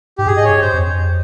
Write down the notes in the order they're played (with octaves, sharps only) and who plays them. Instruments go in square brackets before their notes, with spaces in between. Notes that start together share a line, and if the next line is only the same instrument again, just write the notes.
[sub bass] G#2 [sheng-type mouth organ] G4
[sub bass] G2 [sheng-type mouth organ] G#4
[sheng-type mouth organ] D#5
[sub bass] G#2 [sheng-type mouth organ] C#5
[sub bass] G2
[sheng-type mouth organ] C5
[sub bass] F2